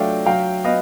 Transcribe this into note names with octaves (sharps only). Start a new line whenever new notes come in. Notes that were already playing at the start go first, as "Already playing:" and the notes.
Already playing: F#3 A3 D4 F5 G5
F#3 F5 G5
B3 D#5 F5